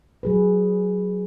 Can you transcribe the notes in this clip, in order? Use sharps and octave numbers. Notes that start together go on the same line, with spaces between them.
F#3 G#4 B4